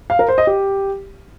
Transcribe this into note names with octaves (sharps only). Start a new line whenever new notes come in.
F5
A#4
C5
D#5
G4